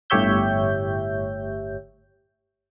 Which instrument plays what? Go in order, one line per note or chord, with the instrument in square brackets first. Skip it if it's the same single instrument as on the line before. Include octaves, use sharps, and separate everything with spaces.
[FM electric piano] G1 A2 G4 C#5 E5 G6